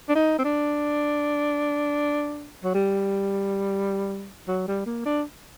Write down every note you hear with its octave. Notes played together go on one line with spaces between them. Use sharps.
D4
D#4
C4
D4
F#3
G3
F#3
G3
A#3
D4